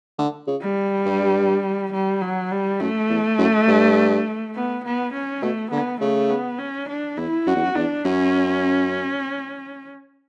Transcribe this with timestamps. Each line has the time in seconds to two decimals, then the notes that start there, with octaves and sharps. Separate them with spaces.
0.18 D3
0.47 C#3
0.62 G3
1.06 G2
1.93 G3
2.22 F#3
2.52 G3
2.80 F#2 A3
3.10 E2
3.39 F#2
3.68 G2
4.55 B3
4.85 B3
5.13 C#4
5.42 B2 A3
5.71 D3 B3
6.00 C#3 A3
6.29 B3
6.59 C#4
6.89 D4
7.17 E2 E4
7.47 F#2 F#4
7.56 E2
7.64 F#2
7.75 E2 D4
8.05 F#2 C#4